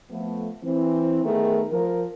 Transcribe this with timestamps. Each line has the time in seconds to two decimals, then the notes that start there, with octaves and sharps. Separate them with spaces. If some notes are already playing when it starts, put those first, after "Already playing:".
0.10 F3 A3 B3
0.62 E3 C4 C5
1.24 D#3 A3 B3 G#4 A#4
1.71 F3 A#4